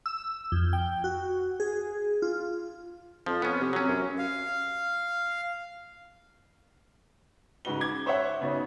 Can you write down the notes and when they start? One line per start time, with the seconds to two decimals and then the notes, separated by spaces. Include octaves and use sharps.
0.06 E6
0.52 F2
0.73 G5
1.04 F#4
1.60 G#4
2.22 F4
3.26 F2 F3
3.42 B3 C#4
3.61 C3
3.73 F#3 C#4
3.88 F#2
4.18 F5
7.65 G#2 C#3 F#4 B4 G7
7.81 D6 G#6
8.06 C5 C#5 E5 F#5
8.41 C#3 B3 D#4 F#4 C#5